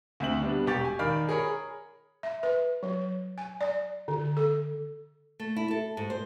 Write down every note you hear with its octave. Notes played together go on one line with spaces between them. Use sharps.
D2 C4 E5 F#7
G3 B3 D4
E1 G4 C#6 A6
G#5
D#3 A#4 D5 F5 B5 F6
G#4 A#4 C#5 B5
E5
B4
F#3
G#5
D5
D3
A4
A3
E4
A4
G#2
C5